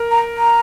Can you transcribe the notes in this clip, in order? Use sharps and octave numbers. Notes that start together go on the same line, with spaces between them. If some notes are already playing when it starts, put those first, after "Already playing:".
Already playing: A#4
A#5
A#5